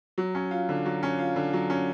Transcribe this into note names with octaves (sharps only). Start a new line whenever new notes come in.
F#3
C#4
F4
D3
F#3
C#4
F4
D3
F#3
C#4